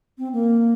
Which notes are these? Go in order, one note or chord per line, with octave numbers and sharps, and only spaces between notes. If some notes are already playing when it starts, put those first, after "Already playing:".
C4
A#3